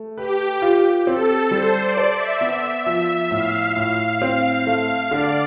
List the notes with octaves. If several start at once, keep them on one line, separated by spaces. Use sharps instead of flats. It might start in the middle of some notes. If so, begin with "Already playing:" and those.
Already playing: A3
G4 B4
F4
C4 A4
G3 C5
D5
C5
E5
B3
F3
A2 F5
A2
C4
A3
D3 D5